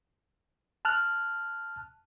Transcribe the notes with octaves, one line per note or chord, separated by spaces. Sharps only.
A5 F6 F#6